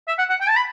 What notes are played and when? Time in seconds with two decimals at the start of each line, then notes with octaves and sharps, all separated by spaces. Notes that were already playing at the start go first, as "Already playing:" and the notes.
0.08 E5
0.19 F#5
0.30 F#5
0.41 G5
0.49 A5
0.57 B5